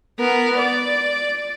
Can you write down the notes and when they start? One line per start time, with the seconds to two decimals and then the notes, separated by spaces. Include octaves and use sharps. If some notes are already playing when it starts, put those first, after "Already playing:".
0.20 B3 A#4
0.58 D5